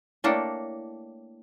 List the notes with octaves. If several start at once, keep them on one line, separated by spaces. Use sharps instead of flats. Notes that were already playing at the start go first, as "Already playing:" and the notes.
A3 A#3 D4 E4 C#5 G5